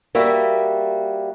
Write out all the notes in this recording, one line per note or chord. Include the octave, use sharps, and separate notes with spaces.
G3 A#3 F#4 E5